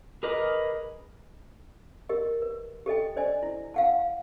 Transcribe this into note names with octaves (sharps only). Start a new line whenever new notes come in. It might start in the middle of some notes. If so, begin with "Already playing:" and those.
G#4 A#4 B4 D#5 D6
G4 A#4 D#5
B4
G4 A4 D#5 G5
D4 C5 D5 D#5 G#5
E4
F5 F#5 A5